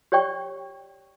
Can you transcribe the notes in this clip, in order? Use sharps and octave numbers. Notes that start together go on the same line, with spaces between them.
G4 C#5 D5 G5 C#6